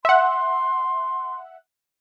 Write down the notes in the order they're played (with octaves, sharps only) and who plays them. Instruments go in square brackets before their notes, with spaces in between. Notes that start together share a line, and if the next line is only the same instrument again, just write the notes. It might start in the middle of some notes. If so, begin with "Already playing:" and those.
[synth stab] E5 F#5 [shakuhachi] C6